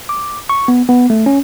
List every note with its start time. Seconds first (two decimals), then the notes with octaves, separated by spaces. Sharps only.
0.09 D6
0.49 C#6
0.68 B3
0.89 B3
1.10 A3
1.26 C#4